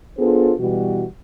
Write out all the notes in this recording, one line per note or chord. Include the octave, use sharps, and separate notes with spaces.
B3 D4 F4 G#4 A4 C5
B2 E3 G3 F#4